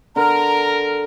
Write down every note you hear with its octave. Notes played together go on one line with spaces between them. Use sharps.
D3 A#4 A#5